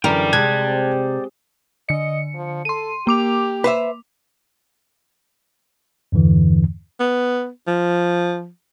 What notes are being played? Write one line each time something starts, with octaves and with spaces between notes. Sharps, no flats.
F#2 D3 E3 A#4 D5 G5
C3 G#3 A5 F#6 G#6
D3 D#5 C#7
F3
A4 C6 D#7
A#3 G4 D6 F7
B4 C5 E5
E2 G2 D3 E3
B3
F3